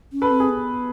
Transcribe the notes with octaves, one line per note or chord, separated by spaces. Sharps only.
C#4
A4 B4
C4
G#4
B3